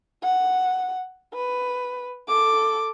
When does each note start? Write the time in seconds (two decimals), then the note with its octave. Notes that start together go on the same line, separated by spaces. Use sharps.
0.23 F#5
1.34 B4
2.28 A4 D6